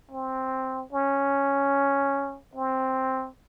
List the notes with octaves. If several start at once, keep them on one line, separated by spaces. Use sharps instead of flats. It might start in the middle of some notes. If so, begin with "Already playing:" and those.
C4
C#4
C4